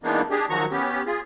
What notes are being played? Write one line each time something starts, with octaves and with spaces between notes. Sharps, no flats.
E3 G#3 A#3 B3 D4 D#4
D4 G4 G#4
D#3 F3 F#3 F#4 A#5 C#6
B3 C#4 G4
F4 G#4